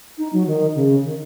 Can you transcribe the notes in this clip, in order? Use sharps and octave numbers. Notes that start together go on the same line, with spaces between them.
D#4
F#3
D#3
C#3
D#3